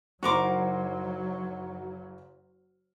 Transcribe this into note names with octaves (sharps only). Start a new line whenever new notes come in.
F#1 F#3 D#4 F#4 A#4 C6 D6